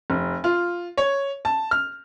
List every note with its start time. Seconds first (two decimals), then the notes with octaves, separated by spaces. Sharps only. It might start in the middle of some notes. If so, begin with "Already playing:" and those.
0.10 F1
0.44 F4
0.97 C#5
1.45 A5
1.71 F6